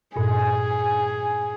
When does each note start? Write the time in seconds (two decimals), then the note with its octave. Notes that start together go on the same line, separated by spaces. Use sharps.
0.16 G2 A#2 G#4 G#5